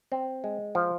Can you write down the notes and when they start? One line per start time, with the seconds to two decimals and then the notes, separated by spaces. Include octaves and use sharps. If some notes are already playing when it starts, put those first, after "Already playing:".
0.12 C4
0.44 G#3
0.75 F3